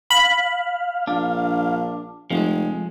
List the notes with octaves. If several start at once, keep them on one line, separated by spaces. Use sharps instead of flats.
F5 B5
A#1 D4
F1 F3 G#3